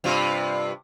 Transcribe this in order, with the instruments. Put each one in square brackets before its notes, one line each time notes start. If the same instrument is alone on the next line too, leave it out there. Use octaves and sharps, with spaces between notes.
[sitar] G2 C3 F4